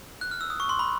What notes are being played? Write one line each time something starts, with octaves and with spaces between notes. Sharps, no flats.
F#6
F6
E6
D#6
C#6
C6
B5